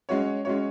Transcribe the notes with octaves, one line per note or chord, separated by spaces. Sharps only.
G#3 C#4 F#4 C#5
G#3 C#4 F#4 C#5